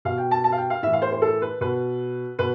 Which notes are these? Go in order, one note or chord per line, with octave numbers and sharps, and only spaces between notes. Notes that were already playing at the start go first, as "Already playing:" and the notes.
B2 F5
G5
A5
A5
F5
G5
F5
A2 E3 E5
F5
C5
C5
A4
B4
B2 B4
B2 B4